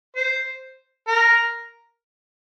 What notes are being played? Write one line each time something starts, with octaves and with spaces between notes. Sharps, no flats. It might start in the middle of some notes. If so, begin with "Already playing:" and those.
C5
A#4